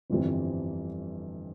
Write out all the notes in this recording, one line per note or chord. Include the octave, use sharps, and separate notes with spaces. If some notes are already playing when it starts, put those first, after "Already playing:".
G1 F2 E3 G3 C4